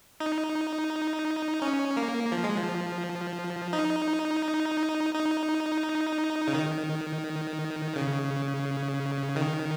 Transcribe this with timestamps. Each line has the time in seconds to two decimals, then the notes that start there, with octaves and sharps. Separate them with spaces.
0.20 D#4
1.62 C#4
1.97 A#3
2.32 F3
2.44 G#3
2.57 F3
3.73 D#4
5.14 D#4
6.48 C#3
6.54 D#3
7.96 C#3
9.36 D#3